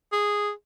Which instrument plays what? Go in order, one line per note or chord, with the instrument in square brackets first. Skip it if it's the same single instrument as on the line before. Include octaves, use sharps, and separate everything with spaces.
[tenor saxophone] G#4